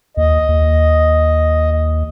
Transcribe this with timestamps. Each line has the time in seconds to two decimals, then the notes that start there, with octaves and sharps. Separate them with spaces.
0.17 D#2 D#5
0.49 D#2